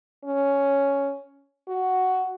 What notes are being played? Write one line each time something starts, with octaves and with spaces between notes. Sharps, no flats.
C#4
F#4